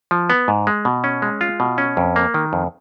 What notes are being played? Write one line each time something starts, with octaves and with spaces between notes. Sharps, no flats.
F3
B3
G#2
G#3
B2
C#4
G#3
F4
B2
C#4
F2
A#3
D#3
F2